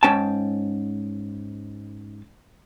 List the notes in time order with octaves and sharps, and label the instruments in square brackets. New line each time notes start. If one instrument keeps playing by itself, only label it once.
[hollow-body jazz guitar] G#2 C#4 G5 A5